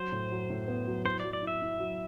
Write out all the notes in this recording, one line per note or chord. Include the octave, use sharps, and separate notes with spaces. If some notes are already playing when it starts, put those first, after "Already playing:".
Already playing: F#3 C5
A2
F#3
A2
B3
F#3
E4 C5
F#3 D5
D5
E4
E5
E4
F#3